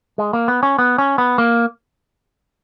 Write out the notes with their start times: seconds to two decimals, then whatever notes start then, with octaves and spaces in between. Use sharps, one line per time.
0.18 G#3
0.33 A#3
0.48 B3
0.63 C#4
0.79 B3
0.98 C#4
1.18 B3
1.38 A#3